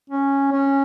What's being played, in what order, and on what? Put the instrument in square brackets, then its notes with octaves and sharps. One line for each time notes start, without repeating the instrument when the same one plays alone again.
[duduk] C#4
C#4